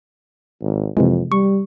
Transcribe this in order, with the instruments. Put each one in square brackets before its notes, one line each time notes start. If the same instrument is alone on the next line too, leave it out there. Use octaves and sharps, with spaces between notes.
[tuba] G#1
[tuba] F2 [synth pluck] C3 E3 G#3
[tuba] G3 [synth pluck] C#6